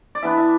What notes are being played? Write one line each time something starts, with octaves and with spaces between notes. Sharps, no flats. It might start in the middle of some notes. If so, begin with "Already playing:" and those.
D5
E3 B3 D4 E5
E5